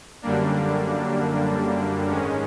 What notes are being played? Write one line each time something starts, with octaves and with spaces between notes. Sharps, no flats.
F#2 D3 G3 A#3 D4
G#2 D#3 G#3 C#4